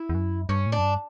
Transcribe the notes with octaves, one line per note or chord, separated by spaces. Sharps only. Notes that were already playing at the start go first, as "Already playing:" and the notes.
Already playing: E4
E2
F#2
G2 C#4
A2
D4
F#2
G2